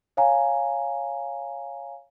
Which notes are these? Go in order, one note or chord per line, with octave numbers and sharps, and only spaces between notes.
C#5 F5 G#5 A#5